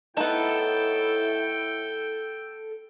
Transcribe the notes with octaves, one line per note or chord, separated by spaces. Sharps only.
A2 B3 D#4 E4 A4 G5 A5